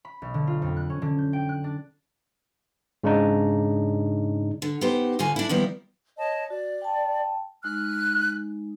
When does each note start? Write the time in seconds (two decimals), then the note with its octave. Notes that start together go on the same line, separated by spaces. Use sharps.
0.05 B5
0.22 B1
0.34 D3
0.47 F4
0.62 F2
0.77 F#6
0.90 C#4
1.02 D3
1.18 G6
1.33 G5
1.49 F#6
1.64 D4
3.04 G#2 C#3 D4 D#4
4.62 D3
4.81 B3 D#4 G4 C5
5.19 D2 D3 F4 G#5
5.36 D4 E4
5.49 D#3 F3 G3 A#3 B3 E4
6.18 C#5 D#5 A5
6.50 F#4 D5
6.81 G5 A5
7.64 G#3 D#4 F6 F#6